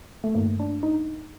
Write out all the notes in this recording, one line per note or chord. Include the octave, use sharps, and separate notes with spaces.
A3
G2 D#3 A3 A#3
D4
D#4